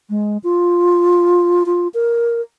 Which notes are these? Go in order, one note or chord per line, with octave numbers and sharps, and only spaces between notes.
G#3
F4
F4
A#4